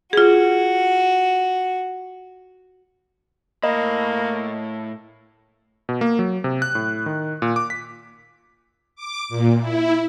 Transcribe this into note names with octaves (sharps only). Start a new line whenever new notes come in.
F4 F#4 G#4
A2 A#3 D#5 B5
B2
A#3
F#3
C3
F#6
A2
D#3
A#2
D6
B6
D6
A#2
E4